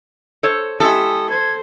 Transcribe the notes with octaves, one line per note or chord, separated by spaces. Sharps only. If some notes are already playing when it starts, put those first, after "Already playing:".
A4 C5 C#5
G#3 C#4 E4 G4 A4 D#6
C5 G#6